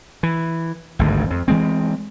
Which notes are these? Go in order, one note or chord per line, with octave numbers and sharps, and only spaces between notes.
E3
G#1 D2 G2
F2
E3 G#3 C4